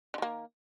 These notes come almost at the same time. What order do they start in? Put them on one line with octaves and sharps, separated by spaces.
D3 D#3 A#3